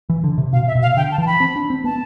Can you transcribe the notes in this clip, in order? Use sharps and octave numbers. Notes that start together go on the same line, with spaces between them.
E3
D3
C3
B2 F5
E5
B2
F5
D3 G5
A5
E3
A5
B5
C4
D4
C4
B3 A5